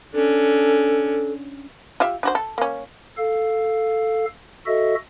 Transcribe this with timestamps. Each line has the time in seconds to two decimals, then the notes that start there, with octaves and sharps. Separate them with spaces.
0.14 C#4 D4 A4
2.00 F4 G4 E5
2.23 D4 F#4 C5
2.35 A4
2.58 A#3 C#4
3.17 A4 F5
4.66 F#4 A4 D#5 E5